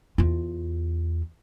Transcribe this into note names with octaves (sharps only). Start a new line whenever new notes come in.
E2 F4